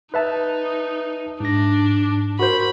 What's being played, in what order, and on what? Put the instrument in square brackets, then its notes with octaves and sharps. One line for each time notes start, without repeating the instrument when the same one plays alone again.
[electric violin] D#4 [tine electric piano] B4 E5 A5
[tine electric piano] G#2 A#6 [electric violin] D4
[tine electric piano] F#4 A#4 C5 [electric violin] B5